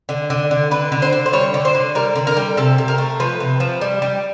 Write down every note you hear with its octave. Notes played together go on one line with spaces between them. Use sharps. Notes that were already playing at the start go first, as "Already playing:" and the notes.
D3
D3
D3
D3 B4
D3
C5
D3
C5
G3 C#5
D3
C5
D3
G3 A#4
D3
A#4
G3
C3 A4
C3
A#4
A3
F3 B4
C3
F3
G3
G3